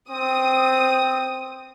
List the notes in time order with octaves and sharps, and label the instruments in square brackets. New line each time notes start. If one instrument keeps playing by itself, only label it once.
[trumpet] C4 [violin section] D#6